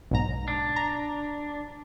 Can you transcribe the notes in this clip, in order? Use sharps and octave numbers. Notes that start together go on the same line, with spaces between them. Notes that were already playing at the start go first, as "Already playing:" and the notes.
B1 G#2 A#5
D4
A#5